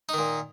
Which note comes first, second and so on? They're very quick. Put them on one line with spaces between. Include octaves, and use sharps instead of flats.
D#4 D#3 A#2